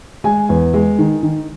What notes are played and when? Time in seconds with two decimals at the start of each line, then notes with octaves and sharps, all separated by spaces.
0.24 G#3 G#5
0.49 E2
0.74 G#3
0.99 D#3
1.23 D#3